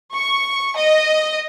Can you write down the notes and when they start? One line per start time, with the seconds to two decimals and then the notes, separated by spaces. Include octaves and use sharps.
0.14 C#6
0.76 D#5